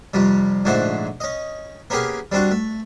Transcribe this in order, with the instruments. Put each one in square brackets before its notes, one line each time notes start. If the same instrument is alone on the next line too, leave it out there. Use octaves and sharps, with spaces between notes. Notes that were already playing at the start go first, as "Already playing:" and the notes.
[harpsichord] F2 C3 G3
A#1 G#2 D3 A3 C5 F#5
C#4 D#5
A#3 B3 C#4 G4 G#4 A#4
G3 C4 D4 F#4
A3